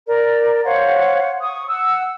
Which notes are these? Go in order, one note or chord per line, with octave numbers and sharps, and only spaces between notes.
A#4 D5
C5 C#5 F5 F#5
C#6 D#6
F#5 E6